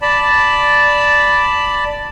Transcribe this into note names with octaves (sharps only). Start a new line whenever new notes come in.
D5 A5 B5